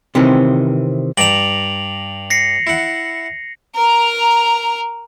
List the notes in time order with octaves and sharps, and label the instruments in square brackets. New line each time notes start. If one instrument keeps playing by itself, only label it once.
[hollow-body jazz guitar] C3 D#3 E3 C4 C#4
[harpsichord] G2 D5 A#5 [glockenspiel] F7 F#7
[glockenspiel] A#6 C7 C#7
[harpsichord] E4 F#5
[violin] A#4 A#5